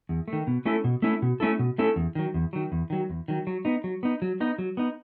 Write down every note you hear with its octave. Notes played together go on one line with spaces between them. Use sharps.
E2
A3
D#3
B2
A3 C#4 E4 A4
B2
A3 C#4 E4 A4
B2
A3 C#4 E4 A4
B2
A3 C#4 E4 A4
E2
D#3 F#3
E2
D#3 F#3
E2
D#3 F#3
E2
D#3 F#3
F#3
B3 D#4
F#3
B3 D#4
F#3
B3 D#4
F#3
B3 D#4